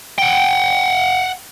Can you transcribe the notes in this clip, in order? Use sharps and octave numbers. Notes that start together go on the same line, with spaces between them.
F#5 G5